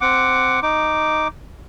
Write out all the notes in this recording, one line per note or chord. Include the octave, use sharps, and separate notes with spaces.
C4 F#5 D6
D#4 D6